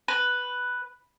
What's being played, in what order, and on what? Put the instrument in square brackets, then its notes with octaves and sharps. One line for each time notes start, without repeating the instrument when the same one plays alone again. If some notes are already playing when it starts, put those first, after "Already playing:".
[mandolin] B4